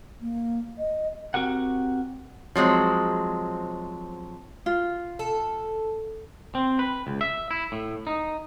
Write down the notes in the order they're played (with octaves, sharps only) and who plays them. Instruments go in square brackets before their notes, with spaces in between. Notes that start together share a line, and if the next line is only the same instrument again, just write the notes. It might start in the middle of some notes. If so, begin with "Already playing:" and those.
[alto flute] A#3
D#5
[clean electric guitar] C4 F#4 G4 A#4 F#5
[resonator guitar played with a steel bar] F3 F#3 G#3 C4
[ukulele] F4
[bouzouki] A4
[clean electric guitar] C4
B4
C#2
E5
E4
A2
D#4